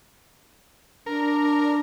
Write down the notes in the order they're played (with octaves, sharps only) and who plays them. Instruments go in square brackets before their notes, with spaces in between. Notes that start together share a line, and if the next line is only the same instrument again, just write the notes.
[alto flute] D4 [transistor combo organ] A#4